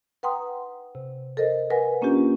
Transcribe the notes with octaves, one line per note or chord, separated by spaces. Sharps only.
B4 F#5 G5 A#5 C6 D#6
C3
A4 A#4 C5 D#5
A#4 B4 F#5 G#5
A#3 C#4 D4 F4 G4